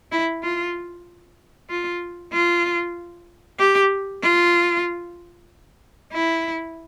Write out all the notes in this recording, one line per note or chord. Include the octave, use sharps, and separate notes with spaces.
E4
F4
F4
F4
G4
F4
E4